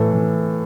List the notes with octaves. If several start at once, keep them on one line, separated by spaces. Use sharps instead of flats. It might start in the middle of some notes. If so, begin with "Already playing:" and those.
Already playing: A2 E3 A4
E3